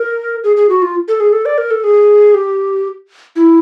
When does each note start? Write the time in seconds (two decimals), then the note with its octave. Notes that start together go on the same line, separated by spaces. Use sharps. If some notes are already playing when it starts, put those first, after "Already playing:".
Already playing: A#4
0.44 G#4
0.57 G#4
0.69 F#4
0.82 F4
1.08 A4
1.20 G#4
1.33 A4
1.46 D5
1.58 A#4
1.71 A4
1.84 G#4
2.34 G4
3.36 E4